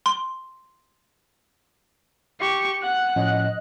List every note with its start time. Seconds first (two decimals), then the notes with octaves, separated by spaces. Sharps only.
0.06 C6
2.40 G4 C#6
2.83 F#5 F#6
3.16 A2 F3 C#4 D#5